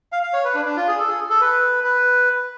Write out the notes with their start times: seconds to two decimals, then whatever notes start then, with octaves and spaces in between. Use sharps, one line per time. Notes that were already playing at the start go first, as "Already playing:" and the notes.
0.13 F5
0.23 F5
0.33 C#5
0.44 B4
0.55 D4
0.65 D4
0.77 F4
0.88 G#4
0.99 A4
1.09 G#4
1.30 A4
1.41 B4
1.84 B4